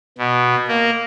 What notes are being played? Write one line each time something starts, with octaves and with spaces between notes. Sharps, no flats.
B2
A#3